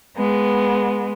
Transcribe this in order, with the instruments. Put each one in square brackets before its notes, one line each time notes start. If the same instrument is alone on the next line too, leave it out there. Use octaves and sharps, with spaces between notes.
[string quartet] G#3 B3